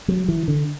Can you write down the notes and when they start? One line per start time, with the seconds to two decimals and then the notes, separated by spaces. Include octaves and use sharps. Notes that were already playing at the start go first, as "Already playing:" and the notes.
0.08 F#3
0.28 E3
0.48 D3